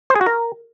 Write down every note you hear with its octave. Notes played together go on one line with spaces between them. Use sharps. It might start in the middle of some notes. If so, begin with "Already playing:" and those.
C5
G#4
F#4
A#4